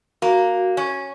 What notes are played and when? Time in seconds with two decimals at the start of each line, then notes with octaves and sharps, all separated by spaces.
0.22 A#3 F#4
0.77 C#4